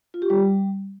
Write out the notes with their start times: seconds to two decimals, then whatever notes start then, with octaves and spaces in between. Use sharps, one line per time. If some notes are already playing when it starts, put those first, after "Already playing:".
0.14 F4
0.22 G4
0.30 G3